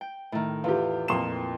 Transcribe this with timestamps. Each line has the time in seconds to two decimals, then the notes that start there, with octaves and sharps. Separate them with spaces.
0.01 G5
0.32 A2 D#3
0.64 E2 F4 G4
1.08 F2 A#2 C6 E7